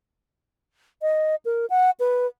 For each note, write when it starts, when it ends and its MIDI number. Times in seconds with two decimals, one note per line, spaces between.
1.02 1.35 75
1.45 1.66 70
1.70 1.90 78
2.00 2.27 71